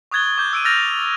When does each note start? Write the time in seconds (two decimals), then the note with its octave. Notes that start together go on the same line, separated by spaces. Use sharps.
0.11 C#6 D#6 F#6 G#6 A6 G7
0.38 D6 G6
0.53 E6 D7 D#7
0.64 E6 F6 G6 A6 A#6 F7